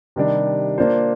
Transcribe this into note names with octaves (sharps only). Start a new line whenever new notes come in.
C3 D#3 G3 D4
A#3 D4 F4 C5